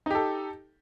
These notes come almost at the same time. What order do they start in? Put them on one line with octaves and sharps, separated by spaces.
D#4 G4 A4